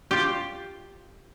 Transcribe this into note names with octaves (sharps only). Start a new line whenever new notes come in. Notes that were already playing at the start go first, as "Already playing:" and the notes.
F4 G4